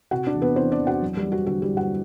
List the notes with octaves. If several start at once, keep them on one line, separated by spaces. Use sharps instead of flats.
C3 F#4 F#5
D4 D5
E2
B3 B4
E3 C4 C5
D4 D5
E2
F#4 F#5
F#3
G3 G4
F#3
F#4
D3 F#4
G3 G4
G2
F#4 F#5